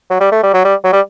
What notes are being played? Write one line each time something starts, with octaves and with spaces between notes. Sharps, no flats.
F#3
G3
A3
G3
F#3
G3
F#3
G3